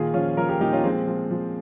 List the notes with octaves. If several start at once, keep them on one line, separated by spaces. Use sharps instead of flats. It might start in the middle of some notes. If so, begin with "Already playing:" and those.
Already playing: A#2 D#3 F4 G#4
F3 C#4 F4
F3 A#4 C#5
G4 A#4
A#2 D#4 G4
C#4 F4
F3 G#3 C4
F3
F3